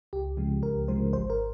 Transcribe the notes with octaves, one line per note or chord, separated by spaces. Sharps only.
C#2 G4
C#3 F3 G#3
C#2 A#4
C#3 F3 G#3 C5
G#1 C5
A#4